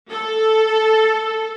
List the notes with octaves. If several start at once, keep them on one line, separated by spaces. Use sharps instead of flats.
A4